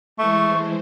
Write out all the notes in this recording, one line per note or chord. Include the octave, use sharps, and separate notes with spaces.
E3 G#3 A3 C5 C#6